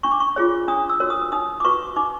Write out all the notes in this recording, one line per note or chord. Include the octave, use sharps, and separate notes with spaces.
D4 C#6
D6
C#6
F4 G#4 C#5
D4 D#6
E6
F#4 A#4 C#5
D#6
D#4 D#6
D6
F#4 B4 C#6
D#4 D6